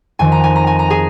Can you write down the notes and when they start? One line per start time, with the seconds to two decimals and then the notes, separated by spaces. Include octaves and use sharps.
0.19 F2 D#3 G#5
0.32 A#5
0.44 G#5
0.56 A#5
0.67 G#5
0.79 A#5
0.90 G#4 G#5